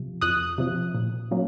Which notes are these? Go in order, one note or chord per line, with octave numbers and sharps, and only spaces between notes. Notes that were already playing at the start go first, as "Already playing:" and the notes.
Already playing: C3 F3
F2 D#6 F#6
C3 F3
A#2
F#3 A#3 C#4